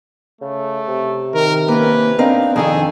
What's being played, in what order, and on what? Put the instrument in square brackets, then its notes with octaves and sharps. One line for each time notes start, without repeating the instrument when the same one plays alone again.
[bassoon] C#3 [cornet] A3
[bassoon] C3
[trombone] D#3 [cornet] A#4
[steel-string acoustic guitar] A#3 C#4 [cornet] B4
[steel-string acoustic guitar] C4 A#4 F5 [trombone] D4 [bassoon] D#4
[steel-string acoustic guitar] F2 D#3 A4 [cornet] G#4